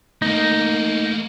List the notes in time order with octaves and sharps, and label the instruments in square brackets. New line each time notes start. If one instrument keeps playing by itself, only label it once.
[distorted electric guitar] A3 A#3 [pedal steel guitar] D#4